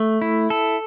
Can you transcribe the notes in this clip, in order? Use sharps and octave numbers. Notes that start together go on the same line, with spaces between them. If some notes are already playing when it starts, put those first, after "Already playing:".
Already playing: A3
E4
A4